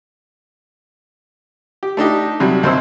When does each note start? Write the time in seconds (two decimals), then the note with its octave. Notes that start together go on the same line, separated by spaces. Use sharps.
1.83 G4
1.97 A3 D4 D#4 G4
2.40 C3 F#3 G3
2.63 D#2 C3 C5 E6